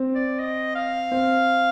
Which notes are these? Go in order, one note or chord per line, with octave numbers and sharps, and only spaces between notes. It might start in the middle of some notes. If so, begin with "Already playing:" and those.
Already playing: C4
D5
D#5
F5
C4